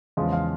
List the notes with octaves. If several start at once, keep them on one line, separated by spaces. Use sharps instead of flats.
E2 C#3 F3 G#3
F5